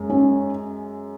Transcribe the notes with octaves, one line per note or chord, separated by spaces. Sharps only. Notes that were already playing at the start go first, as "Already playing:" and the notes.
Already playing: F#2 G#3
C#4